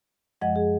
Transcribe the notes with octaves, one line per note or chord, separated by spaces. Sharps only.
F#2 F3 G#3 D#5 F#5
G#4